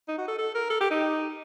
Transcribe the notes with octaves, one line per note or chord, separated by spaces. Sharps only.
D#4
F#4
A4
A4
A#4
A4
G4
D#4